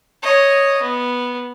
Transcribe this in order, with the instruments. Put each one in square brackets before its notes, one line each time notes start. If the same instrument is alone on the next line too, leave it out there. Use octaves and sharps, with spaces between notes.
[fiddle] C#5 D#5
B3